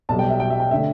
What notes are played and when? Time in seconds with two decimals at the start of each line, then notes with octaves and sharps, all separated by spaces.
0.09 B1 B2 G3 A5
0.19 G5
0.29 E5
0.40 G5
0.50 E5
0.60 G5
0.71 D3 A3 E5